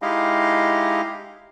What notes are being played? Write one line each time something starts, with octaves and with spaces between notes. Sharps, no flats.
G#3 D#4 E4 G4 D#5 F5